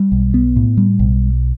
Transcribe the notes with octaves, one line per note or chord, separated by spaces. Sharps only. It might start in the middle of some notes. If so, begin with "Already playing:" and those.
Already playing: G3
B1
B3
A2
G3
B1